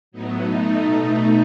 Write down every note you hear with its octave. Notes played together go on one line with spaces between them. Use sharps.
A2 F#3 B3 D#4
B2 A3 D#4